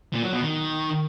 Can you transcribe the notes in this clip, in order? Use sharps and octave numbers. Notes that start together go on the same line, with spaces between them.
A#2
F#3
B2
D#3